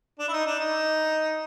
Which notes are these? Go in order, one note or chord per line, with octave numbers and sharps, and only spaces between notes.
D4
E4
D#4
D4
D#4